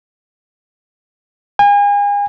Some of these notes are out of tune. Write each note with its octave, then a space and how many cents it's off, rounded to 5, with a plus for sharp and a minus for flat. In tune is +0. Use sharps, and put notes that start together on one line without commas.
G#5 -35